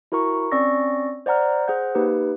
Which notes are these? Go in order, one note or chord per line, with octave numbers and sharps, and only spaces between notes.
E4 F#4 A#4 A#5 C#6
C4 C#4 D5 C#6 E6 A#6
C5 D5 F#5 A#5 F6
G#4 C5 F#5 G6
A#3 D#4 G4 B4